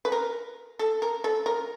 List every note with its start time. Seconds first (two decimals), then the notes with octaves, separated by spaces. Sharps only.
0.05 B4
0.12 A#4
0.79 A4
1.02 A#4
1.24 A4
1.46 A#4